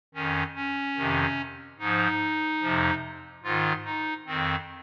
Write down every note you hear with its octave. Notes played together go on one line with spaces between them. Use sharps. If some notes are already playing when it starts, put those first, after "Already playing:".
F2 D#3 C#4
C#4
F2 C3 D#3
G#2 F3 D#4
F2 C3 F3
G#2 D#3 F4
D#4
F2 D#3 C4